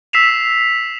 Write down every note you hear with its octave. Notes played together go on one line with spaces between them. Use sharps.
E6 B6 C7 E7 F7